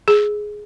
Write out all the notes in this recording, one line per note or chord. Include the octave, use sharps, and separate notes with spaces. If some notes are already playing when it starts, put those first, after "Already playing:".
G#4